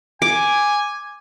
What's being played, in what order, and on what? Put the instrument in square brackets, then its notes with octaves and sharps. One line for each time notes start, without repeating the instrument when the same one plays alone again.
[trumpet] G#5 [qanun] D6